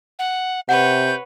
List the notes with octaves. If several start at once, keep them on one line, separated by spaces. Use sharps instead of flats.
F#5
C3 B4 C#5 F#5 G6